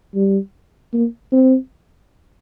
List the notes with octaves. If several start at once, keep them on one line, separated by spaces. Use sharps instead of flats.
G3
A#3
C4